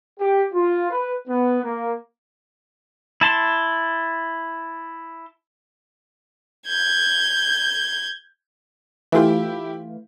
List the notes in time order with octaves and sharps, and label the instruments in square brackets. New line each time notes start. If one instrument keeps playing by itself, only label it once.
[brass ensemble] G4
F4
B4
B3
A#3
[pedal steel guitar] E4 A5 C6
[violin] G6 G#6
[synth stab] E3 A3 F4 [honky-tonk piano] E4 G4